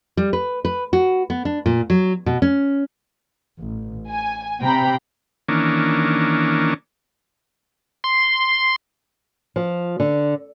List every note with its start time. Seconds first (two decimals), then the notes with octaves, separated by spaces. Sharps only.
0.17 G3
0.33 B4
0.65 B4
0.93 F#4
1.30 B3
1.45 D4
1.66 A#2
1.90 F#3
2.26 B2
2.42 C#4
3.59 A1
4.10 G#5
4.61 C3 G5 A#5 B5
5.48 D#3 E3 A#3 C#4 D4
8.04 C6
9.56 F3
10.00 D3